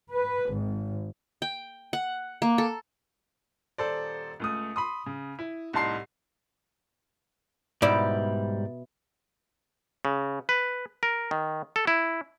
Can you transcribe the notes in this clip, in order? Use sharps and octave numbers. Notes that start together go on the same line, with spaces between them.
B4
G#1
G5
F#5
A#3
A4
D#1 A4 C5 D5
C#2 A3 D#6
B5 C6 D#6
C#3
E4
C2 A2 D#4 A5 C6 C7
G#2 B2 G3 E4 D5
C#3
B4
A#4
D#3
A4
E4